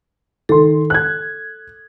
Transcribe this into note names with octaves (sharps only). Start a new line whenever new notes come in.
D#3 A4 C6
F#6 G#6